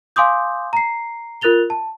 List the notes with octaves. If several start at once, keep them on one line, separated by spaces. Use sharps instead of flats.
F5 G#5 C6 D6 D#6 G6
A#5 C7
F4 A#4 F#6 A6 F7 G7
A5